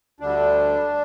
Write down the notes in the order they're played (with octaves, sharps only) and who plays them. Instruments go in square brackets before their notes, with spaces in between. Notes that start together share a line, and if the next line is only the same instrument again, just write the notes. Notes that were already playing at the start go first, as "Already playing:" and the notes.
[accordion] D2 D3 G3 D4